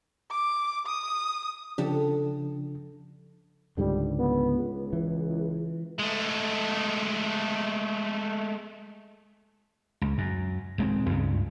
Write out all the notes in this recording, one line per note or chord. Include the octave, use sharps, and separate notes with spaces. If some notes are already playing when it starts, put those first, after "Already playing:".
D6
D#6
C#3 F3 D4 G4 A4
C#2 G#2 D3 G3
B3
C#2
E3
G#3 A3
C#2
F#2
D#1 G#3 A#3 C4
C#2 G2 C#3